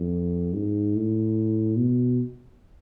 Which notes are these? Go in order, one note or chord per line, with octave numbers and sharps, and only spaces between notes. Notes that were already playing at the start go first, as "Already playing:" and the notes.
Already playing: F2
G#2
A2
B2